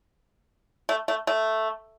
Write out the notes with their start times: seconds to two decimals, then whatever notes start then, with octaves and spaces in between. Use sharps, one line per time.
0.89 A3
1.08 A3
1.27 A3